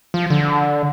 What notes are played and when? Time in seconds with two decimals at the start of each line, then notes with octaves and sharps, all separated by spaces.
0.14 F3
0.30 D3